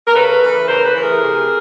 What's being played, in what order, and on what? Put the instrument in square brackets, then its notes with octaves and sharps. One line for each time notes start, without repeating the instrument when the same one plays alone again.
[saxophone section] A#4
C#3 A4 B4
E3 A3
C#3 A#4 C5
A4 B4
E3 A3
G#4 A#4
C3